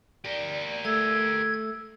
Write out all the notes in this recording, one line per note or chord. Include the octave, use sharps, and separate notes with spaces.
G4 A#4 D5
A3 E6 G#6